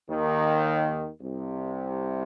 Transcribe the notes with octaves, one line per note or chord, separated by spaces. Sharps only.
D#2 D#3
C2 C3